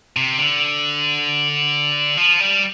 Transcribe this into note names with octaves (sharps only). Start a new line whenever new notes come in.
C3
D3
F3
G3